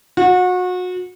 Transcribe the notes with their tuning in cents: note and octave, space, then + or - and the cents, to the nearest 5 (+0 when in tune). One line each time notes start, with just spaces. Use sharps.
F#4 -30